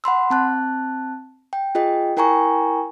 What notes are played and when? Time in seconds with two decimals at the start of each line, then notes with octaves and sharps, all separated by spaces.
0.04 F#5 B5 C6 E6
0.30 C4 A5 F#6
1.53 G5
1.75 F4 G#4 D#5 G5
2.17 E4 A#4 G5 G#5 A#5 C#6